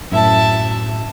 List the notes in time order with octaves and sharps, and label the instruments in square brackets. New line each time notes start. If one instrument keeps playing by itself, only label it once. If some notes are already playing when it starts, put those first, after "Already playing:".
[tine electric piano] F#2 A2 [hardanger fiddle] E5 A5